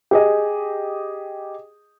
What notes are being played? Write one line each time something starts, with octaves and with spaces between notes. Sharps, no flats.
G4 G#4 D#5